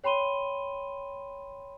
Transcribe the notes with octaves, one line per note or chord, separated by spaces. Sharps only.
C#5 G5 B5 C6 D#7 G7